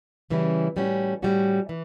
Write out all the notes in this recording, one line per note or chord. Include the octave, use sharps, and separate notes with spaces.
C#3 E3 G3 C#4 E4
A2 G3 C#4 F#4
A2 G3 C#4 F#4
E3